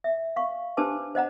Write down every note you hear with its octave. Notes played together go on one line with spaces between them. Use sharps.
E5
F5 C#6
D4 G4 B4 C5 A5 D6
C5 D#5 F#5 A#5